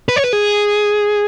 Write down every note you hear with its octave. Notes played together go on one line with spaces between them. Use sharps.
B4
C#5
B4
G#4